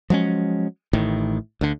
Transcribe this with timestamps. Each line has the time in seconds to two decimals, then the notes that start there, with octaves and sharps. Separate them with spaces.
0.10 F3 F#3 G#3 C#4
0.93 A1 A2 D#3
1.61 D2 D3